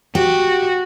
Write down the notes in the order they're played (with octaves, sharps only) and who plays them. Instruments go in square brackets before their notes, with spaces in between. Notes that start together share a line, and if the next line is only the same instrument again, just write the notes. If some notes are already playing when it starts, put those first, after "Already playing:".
[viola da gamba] F#4 [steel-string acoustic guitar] G4